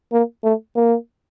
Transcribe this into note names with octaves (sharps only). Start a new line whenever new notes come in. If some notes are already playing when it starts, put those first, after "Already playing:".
A#3
A3
A#3